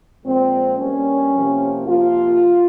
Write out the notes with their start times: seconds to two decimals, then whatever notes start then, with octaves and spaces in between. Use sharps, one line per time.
0.25 A#2 F3 G#3 C4
0.79 G2 G3 A#3 C#4
1.33 C3 F3 A#3
1.87 C3 F3 A#3 F4